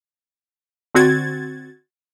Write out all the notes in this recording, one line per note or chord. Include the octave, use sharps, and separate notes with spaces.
D3 C4 F#4 G#6 A6